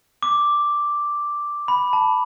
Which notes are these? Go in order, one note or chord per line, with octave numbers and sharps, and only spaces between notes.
D6
B5
A5